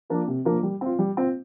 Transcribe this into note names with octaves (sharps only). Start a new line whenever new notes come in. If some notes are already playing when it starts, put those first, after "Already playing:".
F3 A#3 D4
C3
F3 A#3 D4
G3
C4 F4
G3
C4 F4